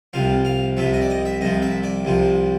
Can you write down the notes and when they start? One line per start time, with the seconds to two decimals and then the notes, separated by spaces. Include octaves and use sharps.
0.13 C2 C3 F3 F5
0.45 F5
0.77 C2 C3 F3 E5
0.93 D#5
1.02 D5
1.10 D#5
1.25 E5
1.41 C2 C3 F3 D#5
1.62 E5
1.83 D5
2.05 C2 C3 F3